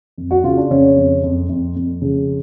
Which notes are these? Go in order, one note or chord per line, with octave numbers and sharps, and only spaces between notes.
F2
F#4
C#3 F4
D4
F2 C#3 C#4
F2
F2
F2
F2
C#3